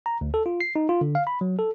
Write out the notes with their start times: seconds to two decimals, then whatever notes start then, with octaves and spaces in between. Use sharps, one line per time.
0.06 A#5
0.21 D2
0.34 A4
0.46 F4
0.61 C7
0.76 D#4
0.89 F4
1.01 D3
1.15 F5
1.27 B5
1.41 F#3
1.59 A4